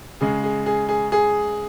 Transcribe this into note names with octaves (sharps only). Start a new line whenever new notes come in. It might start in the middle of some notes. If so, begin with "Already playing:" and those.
C#3 G#3 G#4
G#4
G#4
G#4
G#4